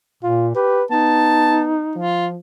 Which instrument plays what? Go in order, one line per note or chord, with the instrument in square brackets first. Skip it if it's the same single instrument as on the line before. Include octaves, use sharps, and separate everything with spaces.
[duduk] A#2 [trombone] F4
[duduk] G4 [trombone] B4
[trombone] B3 [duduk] D#4 [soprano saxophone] A5
[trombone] F3 [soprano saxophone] F4